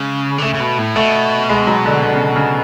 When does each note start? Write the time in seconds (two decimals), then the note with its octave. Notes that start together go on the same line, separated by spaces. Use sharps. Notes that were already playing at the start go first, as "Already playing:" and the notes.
Already playing: C#3 G#3
0.38 D3
0.42 C#3 A3
0.54 C#3
0.60 B2
0.78 A2
0.95 B2 A3
1.49 G#3
1.67 F#3
1.86 D3
2.03 D3
2.13 C#3
2.36 C#3